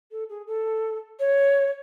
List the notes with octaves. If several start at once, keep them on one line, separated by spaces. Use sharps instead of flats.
A4
G#4
A4
C#5